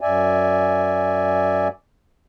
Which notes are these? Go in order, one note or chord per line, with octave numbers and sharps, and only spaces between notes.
F#2 D5 E5 G#5